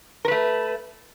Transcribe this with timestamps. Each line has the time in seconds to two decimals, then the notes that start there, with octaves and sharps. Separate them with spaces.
0.25 A#4
0.28 B4
0.31 A3